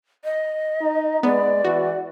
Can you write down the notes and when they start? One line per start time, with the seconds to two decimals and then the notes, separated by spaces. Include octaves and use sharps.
0.24 D#5
0.81 D#4
1.23 G#3 B3 D5
1.64 E3 F#4